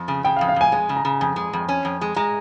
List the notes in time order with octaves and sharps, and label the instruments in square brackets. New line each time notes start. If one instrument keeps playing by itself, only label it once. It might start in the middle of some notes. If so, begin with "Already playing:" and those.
Already playing: [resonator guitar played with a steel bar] F2
C#3
[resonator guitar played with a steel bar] C#3 [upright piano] G5
[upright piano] F5
[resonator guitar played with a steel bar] F2
[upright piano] F5
[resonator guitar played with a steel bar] F2 [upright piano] G#5
[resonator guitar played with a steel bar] G#3 [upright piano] G#5
[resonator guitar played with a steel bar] C#3
[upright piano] A#5
[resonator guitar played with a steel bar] C#3
[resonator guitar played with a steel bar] F2 [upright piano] G#5
[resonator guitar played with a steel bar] G#3
F2
C#4
F2
G#3
[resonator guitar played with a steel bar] G#3 [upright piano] A#5